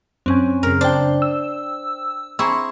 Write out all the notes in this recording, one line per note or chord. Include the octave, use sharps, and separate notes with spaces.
F#2 C4 C#4 G#5
F#2 C#3 A#4
D4 C5 G5
E6
C4 E4 G#4 A#5 C#6 E6